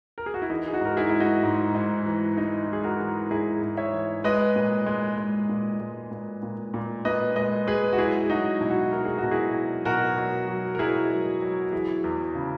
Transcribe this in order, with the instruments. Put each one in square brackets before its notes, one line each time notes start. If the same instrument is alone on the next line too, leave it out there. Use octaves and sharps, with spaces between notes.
[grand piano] A#4
G#4
F#4
E4
E3 D#4
G#4
D#4 F#4
G#2 A#4
E4 G#4
G#3 E4
D#4 F#4
G#2
G#2
E3
G#3 D#4
E3 G#4
F#4 A#4
E3
G#2 E4 G#4
G#2
C#5 E5
E3
G#3 B4 D#5
A#2
G#3
G#3
A#2
G#3
A#2
A#2
A#2
A#2 B4 D#5
G#3 B4 D#5
G#3 G#4 B4
F#4
F#3 E4 G#4
F#3 D#4 F#4
B2 E4
F#4
E4
F#3 A#4
G#4
F#4
B2
E4 G#4
F#3
B2 F#4 A#4
F#3
F#3
A#4
F#3 E4 G#4
F#3
F#3
E3 E4 G#4
E2
C#3